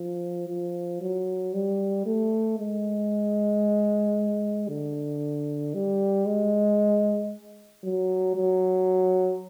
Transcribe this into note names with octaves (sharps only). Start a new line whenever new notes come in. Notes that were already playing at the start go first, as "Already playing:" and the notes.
Already playing: F3
F3
F#3
G3
A3
G#3
D3
G3
G#3
F#3
F#3